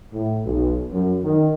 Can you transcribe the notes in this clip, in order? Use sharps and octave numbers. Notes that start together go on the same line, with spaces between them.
A2
B1
F#2
D#3